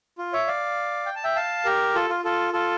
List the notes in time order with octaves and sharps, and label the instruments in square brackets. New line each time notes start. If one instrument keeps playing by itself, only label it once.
[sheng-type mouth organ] F4
C#5 E5
D5 F5
G5
A5
E5 G5
F5 A5
G4 A#4
F4 A4
F4
F4 A4
F4 A4